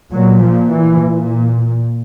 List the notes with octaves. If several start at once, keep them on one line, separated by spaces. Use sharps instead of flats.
A#2 F#3
F3
E3
A#2